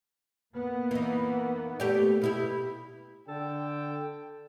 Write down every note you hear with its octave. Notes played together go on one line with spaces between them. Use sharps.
A#3 B3
E3 D#4
A3 G4 D5
B2 E4 G4
D3 A4 G5